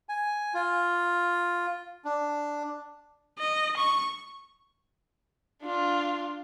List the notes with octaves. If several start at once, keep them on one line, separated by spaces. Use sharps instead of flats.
G#5
F4
D4
D#5
C#6
D4 F4